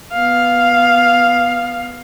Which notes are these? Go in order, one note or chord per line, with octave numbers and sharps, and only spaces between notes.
B3 F5